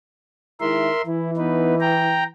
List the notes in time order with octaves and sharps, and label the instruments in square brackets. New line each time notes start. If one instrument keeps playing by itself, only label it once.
[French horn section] D#3 G#3 E4 [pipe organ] A#4 E5 C6
[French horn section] E3 [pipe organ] E4
[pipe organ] B3 D#4 B4
G5 A#5